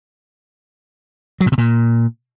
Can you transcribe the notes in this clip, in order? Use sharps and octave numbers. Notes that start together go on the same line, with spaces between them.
F#3
A2
C3
A#2